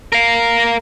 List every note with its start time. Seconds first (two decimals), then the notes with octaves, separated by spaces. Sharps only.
0.12 A#4 F5